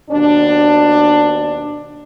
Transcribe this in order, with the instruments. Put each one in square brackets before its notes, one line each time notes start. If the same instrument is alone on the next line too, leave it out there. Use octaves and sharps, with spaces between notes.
[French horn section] D#2 B2 D4